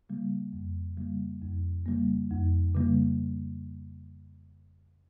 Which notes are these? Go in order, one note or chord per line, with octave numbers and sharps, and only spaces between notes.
C#3 G3 A#3
F2
C#3 G3 A#3
F2
C#3 G3 A#3
F2
C#3 G3 A#3